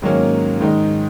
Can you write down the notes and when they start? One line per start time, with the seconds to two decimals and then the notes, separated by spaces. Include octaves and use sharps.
0.02 G#2 D#3 F#3 A#3 C#4
0.60 G#2 D#3 G#3 D#4